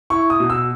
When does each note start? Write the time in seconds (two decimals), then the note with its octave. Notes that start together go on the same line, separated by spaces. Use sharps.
0.10 E4 C#6
0.30 D#6
0.40 B2
0.50 E6